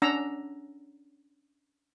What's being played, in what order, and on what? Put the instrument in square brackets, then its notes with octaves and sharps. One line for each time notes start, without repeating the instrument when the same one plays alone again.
[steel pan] C#4 D4 F#5 A#5 E6